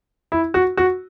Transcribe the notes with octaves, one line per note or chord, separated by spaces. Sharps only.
E4
F#4
F#4